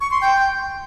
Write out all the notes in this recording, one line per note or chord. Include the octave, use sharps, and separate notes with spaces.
C#6
C6
G5